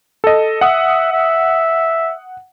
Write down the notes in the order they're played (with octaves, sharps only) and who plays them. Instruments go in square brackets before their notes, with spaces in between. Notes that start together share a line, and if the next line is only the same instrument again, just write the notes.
[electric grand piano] A4 D#5
[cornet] E5 [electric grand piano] F#5 D#6
[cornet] E5